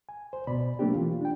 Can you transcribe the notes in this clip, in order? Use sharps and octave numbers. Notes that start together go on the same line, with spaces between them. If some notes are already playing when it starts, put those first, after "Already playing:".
G#5
C5
B2 D5 B5
F#3 A3 A#3 C4 D4 G4
E3 F4
D4 G5